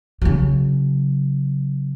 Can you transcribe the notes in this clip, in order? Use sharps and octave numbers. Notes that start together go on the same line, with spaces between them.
C#3 F#3